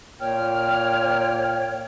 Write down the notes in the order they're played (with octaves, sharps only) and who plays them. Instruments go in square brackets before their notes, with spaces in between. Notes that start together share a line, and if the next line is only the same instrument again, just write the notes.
[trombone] A#2 [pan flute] C#5 [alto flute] G5 [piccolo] F6